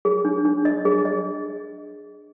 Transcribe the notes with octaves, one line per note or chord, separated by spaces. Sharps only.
G#4
D4
D4
D#5
G#4
D#5